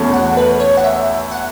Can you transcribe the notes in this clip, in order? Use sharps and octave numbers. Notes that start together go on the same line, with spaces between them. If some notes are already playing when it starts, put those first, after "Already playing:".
Already playing: E2 B2 A3 C#4 A4
F#5
B4
C#5
F#5
E5
F#5